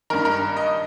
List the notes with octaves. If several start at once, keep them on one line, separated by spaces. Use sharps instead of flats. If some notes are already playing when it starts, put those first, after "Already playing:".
G2 D#3 A#4
A#4
D#5